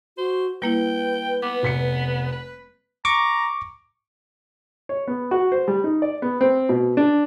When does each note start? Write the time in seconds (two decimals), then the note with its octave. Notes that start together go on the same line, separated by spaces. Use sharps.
0.18 F#4 C5
0.62 G3 A#3 E4 B4 G5
1.42 B3 D6
1.63 F1 B6 C#7
2.32 B4
3.05 A#5 C#6 D6
4.89 C#5
5.08 B3
5.31 F#4
5.52 C5
5.68 G3
5.84 D#4
6.02 D5
6.22 B3
6.41 C4
6.69 B2
6.97 D4